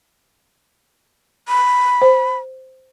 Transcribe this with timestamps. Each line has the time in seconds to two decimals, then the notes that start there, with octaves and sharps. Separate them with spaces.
1.49 B5
2.01 C5